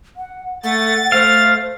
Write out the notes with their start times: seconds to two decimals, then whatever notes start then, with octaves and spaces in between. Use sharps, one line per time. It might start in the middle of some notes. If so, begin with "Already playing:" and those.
0.17 F#5
0.63 A3 F#5 A6
1.12 A3 C5 F5